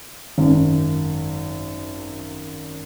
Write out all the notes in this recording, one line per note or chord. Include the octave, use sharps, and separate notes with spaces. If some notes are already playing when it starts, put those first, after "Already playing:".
G#1 F#2